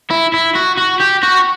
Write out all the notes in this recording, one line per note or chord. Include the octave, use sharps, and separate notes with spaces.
E4
E4
F#4
F#4
G4
F#4